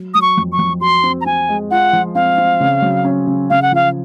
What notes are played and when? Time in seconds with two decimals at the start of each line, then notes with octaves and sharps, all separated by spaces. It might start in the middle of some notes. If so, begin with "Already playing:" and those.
Already playing: F#3
0.14 F#3 D#6
0.22 C#6
0.37 F2
0.52 C#6
0.59 F2
0.81 F#4 C6
1.03 C4
1.21 A#5
1.26 C4 G#5
1.49 G#3
1.71 F4 F#5
1.93 F3
2.15 C4 F5
2.38 C4
2.60 C#3
2.82 F#3
3.05 C#4
3.27 C#3
3.50 C#3 F5
3.62 F#5
3.72 F3 F5